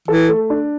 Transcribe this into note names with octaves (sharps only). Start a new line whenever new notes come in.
E3 A4
A3
D4